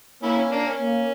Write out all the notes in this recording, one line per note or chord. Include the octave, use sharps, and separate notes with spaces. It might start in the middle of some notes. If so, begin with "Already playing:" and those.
A#3 C#4 E4
C#4
A#3 D4
C#4
A#3